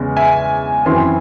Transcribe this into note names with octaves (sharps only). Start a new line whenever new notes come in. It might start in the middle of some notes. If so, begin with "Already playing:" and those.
Already playing: E2 C#3 G#3 C#4
E5 G#5
F#2 E3 C4 E4 G#5 C6